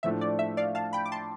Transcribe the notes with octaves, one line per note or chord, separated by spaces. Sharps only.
A2 F3 A3 D4 E5
D5
E5
D5 F5
F5 A5
G5 B5
D6
A5 C6